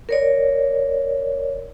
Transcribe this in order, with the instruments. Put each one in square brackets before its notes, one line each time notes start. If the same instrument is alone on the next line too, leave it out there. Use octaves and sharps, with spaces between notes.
[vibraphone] A#4 C#5 D5